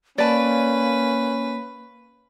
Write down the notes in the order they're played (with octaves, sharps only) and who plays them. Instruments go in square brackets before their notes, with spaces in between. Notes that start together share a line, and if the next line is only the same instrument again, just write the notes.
[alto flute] A#3 [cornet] C#4 [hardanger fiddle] B4 [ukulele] D5 A5